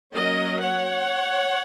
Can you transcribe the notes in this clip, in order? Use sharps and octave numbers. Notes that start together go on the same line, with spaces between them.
F#3 A#3 C#4 A#4 D#5
C#5 F#5